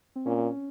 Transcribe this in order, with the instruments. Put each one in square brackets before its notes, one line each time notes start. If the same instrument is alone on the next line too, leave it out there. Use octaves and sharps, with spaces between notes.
[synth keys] C4
[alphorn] A#2 [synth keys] C#4